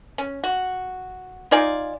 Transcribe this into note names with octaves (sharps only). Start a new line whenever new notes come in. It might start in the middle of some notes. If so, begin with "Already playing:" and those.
C#4
F#4
D#4 F4 D5 G#5